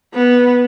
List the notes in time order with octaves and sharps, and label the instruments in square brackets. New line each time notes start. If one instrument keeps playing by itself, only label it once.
[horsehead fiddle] B3